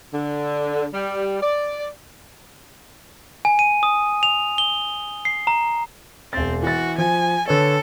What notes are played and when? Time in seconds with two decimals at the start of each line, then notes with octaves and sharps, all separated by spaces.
0.13 D3
0.93 G3
1.41 D5
3.45 G#5
3.59 D#7
3.83 D#6
4.23 F7
4.58 G7
5.25 C7
5.47 A#5
6.33 E1 C4 A6
6.63 E3 F#4 A6
6.98 F3 G#5
7.48 D3 A4 B4 C#5